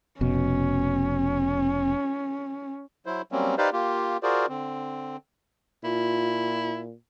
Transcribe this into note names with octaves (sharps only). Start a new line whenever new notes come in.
F1 B2 C#4
F#3 E4 C5
F#3 G3 A#3 C4 C#4
D#4 G4 B4 C5 D5 F5
A#3 F4 G4
F4 F#4 G#4 A#4 C5 D5
D3 C4
A#2 E4 F4